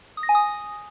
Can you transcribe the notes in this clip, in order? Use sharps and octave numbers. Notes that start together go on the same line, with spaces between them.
D#6
A#6
G#5
D#6